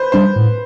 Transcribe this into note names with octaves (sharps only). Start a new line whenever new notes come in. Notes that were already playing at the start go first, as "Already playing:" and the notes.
Already playing: B4 C5
G3 D4 C5
A2